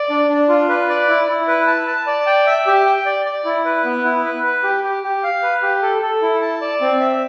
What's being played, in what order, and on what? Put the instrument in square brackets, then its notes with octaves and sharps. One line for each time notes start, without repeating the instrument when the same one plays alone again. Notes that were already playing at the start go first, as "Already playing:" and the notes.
Already playing: [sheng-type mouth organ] D5
D4
D4
F4
B4
D5
E4
E4
B4
A5
A5
D5
G5
E5
G4
G5
D5
D5
E4
B4
B3
E4
B4
B4
G4
G4
G4
F5
B4
G4
A4
A4
E4
A5
D5
C4
E5